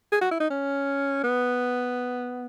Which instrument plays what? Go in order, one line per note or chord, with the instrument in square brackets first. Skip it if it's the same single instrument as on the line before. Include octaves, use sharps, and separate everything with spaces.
[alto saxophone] G#4
F#4
E4
D#4
C#4
B3